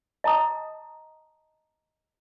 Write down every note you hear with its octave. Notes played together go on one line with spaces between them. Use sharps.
D#5 A5 A#5 D#6